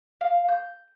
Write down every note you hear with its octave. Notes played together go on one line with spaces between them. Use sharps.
F5
G6